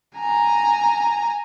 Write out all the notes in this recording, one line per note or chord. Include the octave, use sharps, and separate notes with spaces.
G#5 A#5